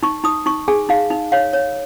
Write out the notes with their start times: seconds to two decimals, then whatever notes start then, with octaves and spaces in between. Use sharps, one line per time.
0.03 D#4 C#6
0.24 D#4 D#6
0.46 D#4 C#6
0.68 G#4 G#5
0.89 D#4 F5
1.10 D#4
1.32 C#5 F5
1.53 C#5